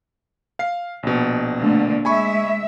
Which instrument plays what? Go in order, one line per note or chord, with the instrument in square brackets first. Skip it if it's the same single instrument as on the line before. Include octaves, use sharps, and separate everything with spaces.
[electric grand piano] F5 C7
A#1 B2
[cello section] D3 A3 A#3
[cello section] G#3 E5 [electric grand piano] G#5 B5 C#6